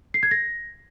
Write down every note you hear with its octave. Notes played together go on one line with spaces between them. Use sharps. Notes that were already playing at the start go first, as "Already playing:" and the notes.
C7
G#6
A#6